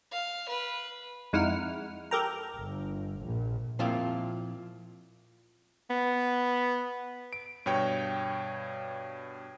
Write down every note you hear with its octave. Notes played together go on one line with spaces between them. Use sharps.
F5
B4
F2 G#3 D#4 E4 F#5 F6
G4 A4 A#4 G5 A#5
G1
A#1 A#2
A#2 F3 C4 E4 F4 F5
B3
D7
G2 B2 C#5 G5